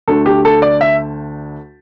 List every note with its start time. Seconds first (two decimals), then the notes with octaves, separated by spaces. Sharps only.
0.08 D2 D3 A3 A4
0.26 G4
0.45 A4
0.62 D5
0.81 E5